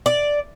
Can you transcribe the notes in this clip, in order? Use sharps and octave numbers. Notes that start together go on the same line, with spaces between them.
D5